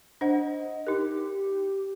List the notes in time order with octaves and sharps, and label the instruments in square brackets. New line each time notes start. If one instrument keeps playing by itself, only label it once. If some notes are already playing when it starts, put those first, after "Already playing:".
[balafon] D4 C5 F#5 [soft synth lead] D#5
[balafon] D#4 A#4 [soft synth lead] G4